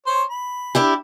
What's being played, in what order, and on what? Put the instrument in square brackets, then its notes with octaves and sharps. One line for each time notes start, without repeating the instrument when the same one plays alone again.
[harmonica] C5 C#5 C6
B5
[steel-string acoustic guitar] D4 E4 G4